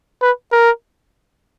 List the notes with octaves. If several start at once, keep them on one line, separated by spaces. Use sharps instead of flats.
B4
A#4